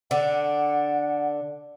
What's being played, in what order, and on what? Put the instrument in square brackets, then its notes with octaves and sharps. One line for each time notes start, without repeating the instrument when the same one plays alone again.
[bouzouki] D3 D4 [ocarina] F#5